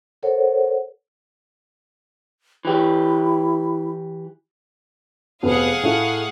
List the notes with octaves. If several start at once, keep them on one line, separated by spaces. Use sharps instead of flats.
A4 A#4 C5 C#5 F#5
E3 E4 G4
F1 B3 G#4 F5 F#5
A2 A3 E4